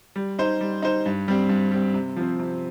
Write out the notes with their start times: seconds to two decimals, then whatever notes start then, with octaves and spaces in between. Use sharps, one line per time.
0.16 G3
0.39 D#4 C5
0.61 G3
0.83 D#4 C5
1.06 G2
1.28 G3 C4
1.49 G2
1.72 G3 C4
1.94 C3
2.16 F3 C4
2.39 C3